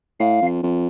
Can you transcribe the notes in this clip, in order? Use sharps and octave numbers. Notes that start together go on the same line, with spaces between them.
A2 F5
F2
F2